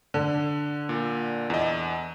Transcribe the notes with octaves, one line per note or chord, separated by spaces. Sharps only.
D3
A#2
E2 D#5